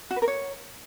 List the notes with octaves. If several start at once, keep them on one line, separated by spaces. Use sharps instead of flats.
F#4
B4
A#4
C#5